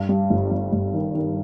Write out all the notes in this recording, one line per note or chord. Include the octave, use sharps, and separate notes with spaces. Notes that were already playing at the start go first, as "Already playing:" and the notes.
Already playing: G2
G3
G1
G2
G1
D#3
D#3